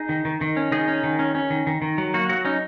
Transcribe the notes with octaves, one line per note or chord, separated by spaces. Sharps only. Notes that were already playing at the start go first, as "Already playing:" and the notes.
Already playing: D#4 G#4
D#3
D#3
D#3
C#4
D#3 D#4 G#4
C#4
D#3
C#4
C#4
D#3
D#3
D#3
F#3
A#3 F#4
F#3 F#4
C#4 D#4